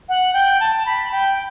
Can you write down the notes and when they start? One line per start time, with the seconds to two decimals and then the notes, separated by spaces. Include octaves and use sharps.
0.09 F#5
0.34 G5
0.60 A5
0.86 B5
1.12 G5